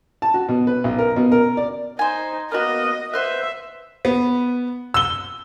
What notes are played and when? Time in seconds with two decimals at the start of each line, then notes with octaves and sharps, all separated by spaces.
0.22 A5
0.34 F#4
0.49 B2
0.67 B4
0.84 B1
0.98 A#4
1.16 B2
1.32 A#4
1.57 D5
1.99 D#4 C5 G#5
2.52 A#3 B3 F#4 D#5
3.13 B4 C5 E5 F#5
4.05 B3
4.94 E6 G7